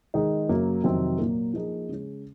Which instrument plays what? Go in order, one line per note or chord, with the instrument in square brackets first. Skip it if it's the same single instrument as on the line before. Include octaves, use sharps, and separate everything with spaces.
[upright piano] D#3 G#3 D#4
F#2 C#3 F#3 A#3
F2 C3 D#3 F#3 C4
A#2 F#3 A#3
F3 A#3 D#4 G#4
C#3 G#3 C#4